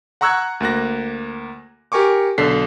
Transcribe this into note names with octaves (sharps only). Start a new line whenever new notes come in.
F#5 A#5 C#6 E6 F#6 G#6
D2 A#3 F#6 A#6
G4 A#4 G#5 C#6 D6
B1 D3 A4 B6 C7